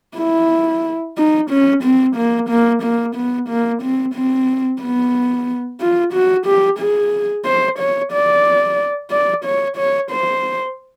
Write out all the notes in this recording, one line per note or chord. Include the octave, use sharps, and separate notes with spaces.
E4
D#4
C#4
C4
A#3
A#3
A#3
B3
A#3
C4
C4
B3
F4
F#4
G4
G#4
C5
C#5
D5
D5
C#5
C#5
C5